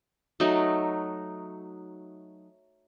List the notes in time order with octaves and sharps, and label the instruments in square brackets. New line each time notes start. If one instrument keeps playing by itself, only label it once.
[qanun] F#3 A3 D#4